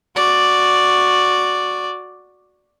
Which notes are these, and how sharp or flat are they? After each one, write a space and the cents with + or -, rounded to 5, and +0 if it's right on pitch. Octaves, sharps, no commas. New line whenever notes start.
F#4 -10 D5 +0